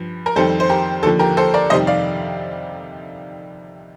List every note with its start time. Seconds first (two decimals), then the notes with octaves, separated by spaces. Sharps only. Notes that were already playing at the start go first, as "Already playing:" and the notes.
Already playing: G2 F3
0.26 A#4
0.36 F2 D#3 G3 A4 C5
0.60 C5
0.69 G4 A#4
1.03 D#2 A4
1.05 D3 F3
1.19 G4 A#4
1.37 A4 C5
1.54 A#4 D5
1.70 F2 C3 D#3 G3 C5 D#5
1.87 D5 F5